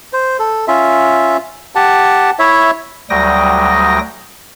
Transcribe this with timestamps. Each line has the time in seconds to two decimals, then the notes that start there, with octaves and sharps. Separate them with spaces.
0.13 C5
0.39 A4
0.68 C#4 F4 E5
1.75 G4 F#5 A5
2.39 E4 C#5 E5
3.10 D2 F#3 G3 G5 D#6 A#6